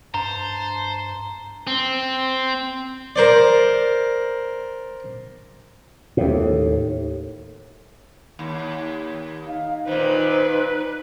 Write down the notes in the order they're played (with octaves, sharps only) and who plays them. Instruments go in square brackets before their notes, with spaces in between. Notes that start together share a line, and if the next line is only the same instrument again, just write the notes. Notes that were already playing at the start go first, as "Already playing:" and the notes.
[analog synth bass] G2 [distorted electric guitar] C5 [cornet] A5 [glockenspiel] A#5
[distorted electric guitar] C4
[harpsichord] A#4 C5 D5
[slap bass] D#2 A2
[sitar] D#2
[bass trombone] D#4 [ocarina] F5
[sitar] A#2 D#3 [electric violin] B4 [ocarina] C5